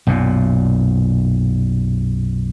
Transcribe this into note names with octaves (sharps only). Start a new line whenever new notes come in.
B1 F#2 A#2